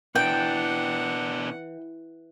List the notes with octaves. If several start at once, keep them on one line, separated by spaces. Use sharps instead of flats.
B2 E3 D4 F#5 G5